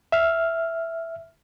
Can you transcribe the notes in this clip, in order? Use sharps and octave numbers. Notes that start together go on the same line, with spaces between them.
E5 F6